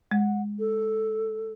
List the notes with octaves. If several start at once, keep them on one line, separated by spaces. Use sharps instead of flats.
G#3 F#5
A4